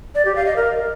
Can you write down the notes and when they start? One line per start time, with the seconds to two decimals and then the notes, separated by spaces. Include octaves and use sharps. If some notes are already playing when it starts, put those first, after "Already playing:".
0.15 D5
0.25 G4
0.36 F5
0.46 D#5
0.56 A#4